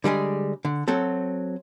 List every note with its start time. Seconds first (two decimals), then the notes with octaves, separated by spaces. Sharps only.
0.04 D3 G3 G#3 G#4
0.65 D3
0.88 F#3 C4 A4